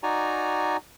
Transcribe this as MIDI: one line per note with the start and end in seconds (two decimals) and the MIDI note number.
0.03 0.77 63
0.03 0.77 66
0.03 0.77 74
0.03 0.77 80
0.03 0.77 82